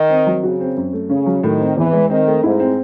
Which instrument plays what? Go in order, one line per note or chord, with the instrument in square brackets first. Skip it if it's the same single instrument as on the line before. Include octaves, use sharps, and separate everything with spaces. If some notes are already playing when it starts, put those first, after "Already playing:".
Already playing: [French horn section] D#3
[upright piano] C4
F#3
[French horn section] C#3 [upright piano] F#4
[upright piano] C4
F#2
A3
[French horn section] C#3 [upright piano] C#4
[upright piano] F#3
[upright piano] A2 [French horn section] D#3
[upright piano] C4
[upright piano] E2 [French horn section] E3
[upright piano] G#3
[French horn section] D#3 [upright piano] C4
[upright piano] A3
[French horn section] G#2 [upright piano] E4
[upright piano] C4